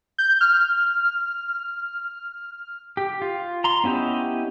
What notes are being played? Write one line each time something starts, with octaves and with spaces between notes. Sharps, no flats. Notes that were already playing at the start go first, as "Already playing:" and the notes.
G6
F6
G4
F4
A#5 C6
B3 C#4 E4 G4 D#5